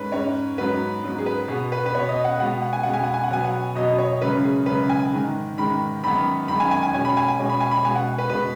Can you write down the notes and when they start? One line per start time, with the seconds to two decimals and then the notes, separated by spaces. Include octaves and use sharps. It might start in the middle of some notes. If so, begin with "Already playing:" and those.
Already playing: G#2 G#3 C#4 B4
0.12 G#2 G#3 C#4 C#5
0.58 G#2 F#3 B3 B4
1.04 G#2 F#3 B3
1.18 G#4
1.26 B4
1.48 B2 G#4
1.52 B3
1.72 B4
1.86 B4
1.94 B3 C#5
1.98 B2
2.09 D#5
2.24 F#5
2.39 B2 G#3 B3 F#5
2.62 F#5
2.73 G#5
2.83 B2 G#3 B3 F#5
2.94 G#5
3.03 F#5
3.14 G#5
3.24 F#5
3.30 B2 F#3 B3 G#5
3.45 F#5
3.76 B2 F#3 B3 D#5
3.98 C#5
4.22 F#2 C#3 G#3 C#4 B4
4.44 G#4
4.66 F#2 C#3 G#3 C#4 B4
4.89 G#5
5.12 G#2 D#3 G#3
5.57 G#2 D#3 G#3 B5
6.03 F#2 D#3 G#3 B3 B5
6.48 F#2 D#3 G#3 B3 B5
6.60 G#5
6.71 G#5
6.83 G#5
6.94 B2 G#3 C#4 G#5
7.05 B5
7.17 G#5
7.28 G#5
7.40 B2 G#3 C#4
7.50 B5
7.60 G#5
7.71 B5
7.85 B2 G#3 B3 G#5
7.96 F#5
8.18 B4
8.30 B2 G#3 B3 B4